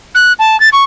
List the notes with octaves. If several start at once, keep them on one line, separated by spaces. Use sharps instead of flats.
F#6
A5
A6
C#6